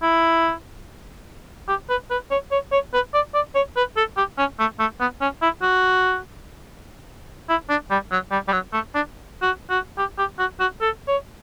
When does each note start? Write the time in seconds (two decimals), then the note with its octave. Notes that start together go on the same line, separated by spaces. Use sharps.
0.03 E4
1.68 G4
1.90 B4
2.11 B4
2.31 C#5
2.52 C#5
2.72 C#5
2.94 B4
3.14 D5
3.34 D5
3.55 C#5
3.77 B4
3.97 A4
4.17 G4
4.38 C#4
4.60 A3
4.80 A3
5.00 B3
5.21 C#4
5.42 E4
5.63 F#4
7.49 E4
7.70 D4
7.91 G3
8.12 F#3
8.31 G3
8.48 G3
8.53 F#3
8.73 A3
8.95 D4
9.42 F#4
9.70 F#4
9.98 G4
10.18 G4
10.39 F#4
10.60 F#4
10.81 A4
11.08 C#5